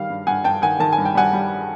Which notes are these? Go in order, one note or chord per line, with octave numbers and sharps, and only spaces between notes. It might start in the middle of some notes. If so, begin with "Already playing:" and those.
Already playing: D#3 G3 F5
G2
G2 F#5 G#5
G2 G5 A5
D#3 F#5 G#5
D#3 A5
G#5
G2
G5
G3 F#5 G#5
G3